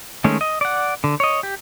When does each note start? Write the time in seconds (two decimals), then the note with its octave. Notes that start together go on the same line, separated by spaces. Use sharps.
0.24 D#3 G#3 A3 C#4
0.41 D#5
0.61 D5 F#5
1.04 D3
1.20 C#5 D#5
1.43 G4